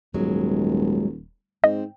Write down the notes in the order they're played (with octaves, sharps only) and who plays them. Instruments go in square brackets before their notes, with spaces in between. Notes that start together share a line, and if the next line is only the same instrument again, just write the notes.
[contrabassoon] D#1 [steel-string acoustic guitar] G#2 F#3 G#3
[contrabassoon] G#2 [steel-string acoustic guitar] C4 [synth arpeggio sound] D#5